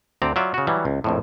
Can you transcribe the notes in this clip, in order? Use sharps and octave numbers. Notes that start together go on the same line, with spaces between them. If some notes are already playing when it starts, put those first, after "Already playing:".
D2 C4 D5 A#5
F#3 F4 D5 E5
C#3 F#4
E3 F#3 G3
C#2
A#1 F2 A2